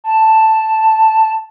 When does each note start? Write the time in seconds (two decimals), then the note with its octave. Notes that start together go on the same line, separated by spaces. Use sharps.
0.04 A5